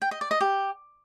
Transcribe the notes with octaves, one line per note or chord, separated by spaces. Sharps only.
G5
D#5
D5
D#5
G4